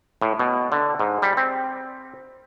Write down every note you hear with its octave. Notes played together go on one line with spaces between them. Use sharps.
A2
B2
D3
G#2
G3
C4